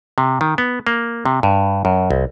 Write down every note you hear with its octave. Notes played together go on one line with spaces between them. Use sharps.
C3
D#3
B3
A#3
C3
G2
F#2
C2